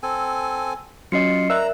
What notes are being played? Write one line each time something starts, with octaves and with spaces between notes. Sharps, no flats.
C4 A4 G#5
F#3 C#4 F4 D#5 C7 C#7
A#4 D5 E5 A#5 E6 F#6